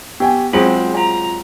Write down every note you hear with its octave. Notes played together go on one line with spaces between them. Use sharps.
B3 G4 G5 G#5
F#3 G#3 C4 F4 B4 F#7
F4 A#5